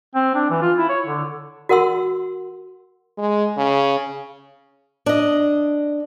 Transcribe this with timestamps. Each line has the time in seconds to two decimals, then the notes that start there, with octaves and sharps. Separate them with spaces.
0.15 C4
0.35 D4
0.50 E3
0.62 F4
0.78 E4
0.90 C#5
1.06 D3
1.69 F#4 A#4 F#5 C6 E6
3.18 G#3
3.57 C#3
5.06 D4 D#5